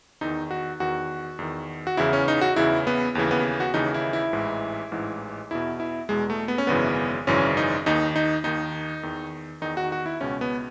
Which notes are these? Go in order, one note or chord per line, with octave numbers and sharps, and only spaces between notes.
E2 D#3 D#4
F#4
E2 D#3 F#4
E2 D#3
F#4
E2 C#3 E3 E4
C#4
D#4
F#4
E2 C#3 E3 E4
B3
D#2 C#3 E3
B3
F#4
D#2 C#3 E3 D#4
E4
E4
A1 G#2 E3
A1 G#2 E3
E2 B2 E4
E4
E2 B2 G#3
A3
B3
C#4
G#1 F#2 C#3 E3 B3
G#1 F#2 C#3 E3 C#4
D#4
D#2 D#3 D#4
D#4
D#2 D#3 D#4
E2 D#3
E2 D#3 D#4
F#4
F#4
E4
C#2 B2 C#4
B3